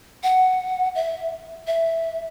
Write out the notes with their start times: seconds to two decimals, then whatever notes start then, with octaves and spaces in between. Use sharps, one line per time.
0.23 F#5
0.95 E5
1.67 E5